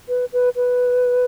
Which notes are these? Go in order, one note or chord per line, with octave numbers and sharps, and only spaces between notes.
B4
B4
B4